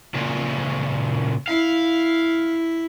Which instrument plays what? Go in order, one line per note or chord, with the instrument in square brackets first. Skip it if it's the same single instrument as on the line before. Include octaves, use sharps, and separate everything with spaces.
[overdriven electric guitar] A#2 C#3
[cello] E4 [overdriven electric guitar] F5